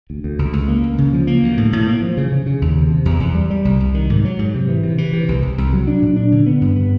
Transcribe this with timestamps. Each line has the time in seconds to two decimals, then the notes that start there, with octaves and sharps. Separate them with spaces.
0.10 D2
0.24 D2
0.39 C#2
0.53 C#2
0.68 A#3
0.84 C#2
0.98 C#3
1.13 F3
1.27 A#3
1.43 D2
1.57 A2
1.73 A2
1.87 A#3
2.02 F3
2.17 C#3
2.32 C#3
2.46 C#3
2.62 D#2
2.76 C3
2.90 C3
3.05 E2
3.20 E2
3.35 G3
3.50 G3
3.65 C2
3.80 C2
3.94 D#3
4.10 G#2
4.25 F#3
4.39 G#2
4.54 C3
4.69 E3
4.83 C3
4.98 E3
5.13 C3
5.28 C2
5.43 C2
5.58 C2
5.73 F#3
5.88 D4
6.02 A#2
6.16 D4
6.32 D3
6.46 B3
6.61 G2
6.76 B3